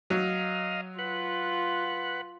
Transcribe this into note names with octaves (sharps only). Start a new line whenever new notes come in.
F#3 D#5 F5
F4 B4 F#5